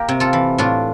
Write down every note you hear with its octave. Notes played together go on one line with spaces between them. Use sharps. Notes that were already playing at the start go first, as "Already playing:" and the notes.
Already playing: A#3 G4 A#4
C3
F4 A4
E3
A2 D4 F4